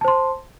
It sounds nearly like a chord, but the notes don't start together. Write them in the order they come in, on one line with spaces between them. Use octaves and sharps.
A5 C5 C6